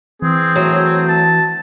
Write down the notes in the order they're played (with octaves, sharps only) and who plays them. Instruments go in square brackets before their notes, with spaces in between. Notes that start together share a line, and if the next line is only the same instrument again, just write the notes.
[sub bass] E3 [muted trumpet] C4 [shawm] G#4
[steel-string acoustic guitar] F#3 A3
[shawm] A5